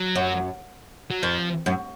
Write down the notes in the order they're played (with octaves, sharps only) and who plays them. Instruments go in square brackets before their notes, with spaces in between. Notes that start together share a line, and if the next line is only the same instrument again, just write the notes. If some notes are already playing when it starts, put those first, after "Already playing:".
Already playing: [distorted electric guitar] F#3
[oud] F#2
[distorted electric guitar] F#3
[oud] F2 [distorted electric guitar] F3
[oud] F#2